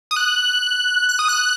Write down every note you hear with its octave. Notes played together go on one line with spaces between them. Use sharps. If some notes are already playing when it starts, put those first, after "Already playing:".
D#6
F#6
F#6
D#6
F#6